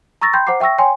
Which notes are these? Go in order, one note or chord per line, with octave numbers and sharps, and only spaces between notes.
A#5 C#6 E6 A6 A#6
G5 B5 C6 G6
C5 F#5 A#5 D6 C7
E5 G5 C#6 E6 A#6
C#5 G5 G#5 C6